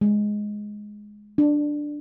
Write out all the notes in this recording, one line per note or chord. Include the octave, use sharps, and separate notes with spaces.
G#3
D4